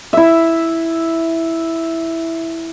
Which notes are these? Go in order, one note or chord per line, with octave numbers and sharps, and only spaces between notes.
E4 E5